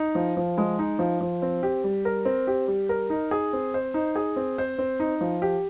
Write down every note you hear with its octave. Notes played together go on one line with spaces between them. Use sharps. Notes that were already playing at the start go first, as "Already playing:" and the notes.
Already playing: D#4
F3
F3
G#3
D#4
F3
F3
C4
G4
G3
A#4
C4
G4
G3
A#4
D#4
G#4
C4
C5
D#4
G#4
C4
C5
C4
D#4
F3
G4